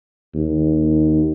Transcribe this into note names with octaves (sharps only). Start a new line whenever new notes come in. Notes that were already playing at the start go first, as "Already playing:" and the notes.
D#2